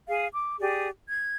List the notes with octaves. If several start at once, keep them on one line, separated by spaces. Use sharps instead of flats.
G#4 F5
D6
G4 G#4 D5
G#6